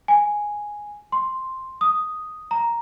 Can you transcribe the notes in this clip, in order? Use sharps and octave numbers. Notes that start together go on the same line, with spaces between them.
G#5
C6
D#6
A#5